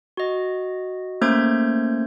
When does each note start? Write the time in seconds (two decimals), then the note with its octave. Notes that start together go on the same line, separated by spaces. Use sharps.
0.17 F#4 D#5
1.22 A3 A#3 C#4 C5 G6 G#6